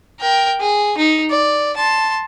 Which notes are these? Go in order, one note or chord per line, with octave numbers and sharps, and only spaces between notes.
A#4 G5
G#4
D#4
D5
A5 C6